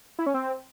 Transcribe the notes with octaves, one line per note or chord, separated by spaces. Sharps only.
E4
C#4
C4